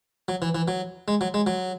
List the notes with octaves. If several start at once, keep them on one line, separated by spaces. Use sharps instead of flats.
F#3
E3
E3
F#3
G#3
F#3
G#3
F#3